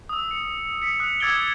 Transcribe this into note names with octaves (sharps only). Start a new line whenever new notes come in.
D#6 E6
C#7
D#6 B6 C#7
D#6 F#6
D6 E6 G#6 A6 D7 G7